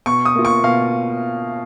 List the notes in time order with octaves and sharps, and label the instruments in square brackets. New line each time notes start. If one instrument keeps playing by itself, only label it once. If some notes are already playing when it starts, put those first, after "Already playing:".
[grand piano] B2 C#6
D#6
A#3 F4
C#6
B2 F5